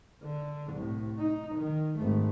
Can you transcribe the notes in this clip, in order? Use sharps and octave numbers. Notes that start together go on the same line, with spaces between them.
D3
C2 A2
D#4
D#3
G#1 A3